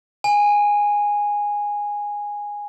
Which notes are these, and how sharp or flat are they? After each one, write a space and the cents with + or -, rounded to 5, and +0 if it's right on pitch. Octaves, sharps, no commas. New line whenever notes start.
G#5 -10